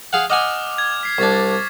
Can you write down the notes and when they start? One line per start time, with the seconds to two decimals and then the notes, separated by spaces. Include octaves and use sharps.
0.13 G#4 F5 F#5
0.30 D#5 F#5 G#5 D6 F6 F7
0.78 G#6
1.03 B6 C7
1.18 C2 D4 C#6 A6